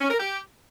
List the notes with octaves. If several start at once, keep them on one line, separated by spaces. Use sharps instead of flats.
C#4
A#4
G4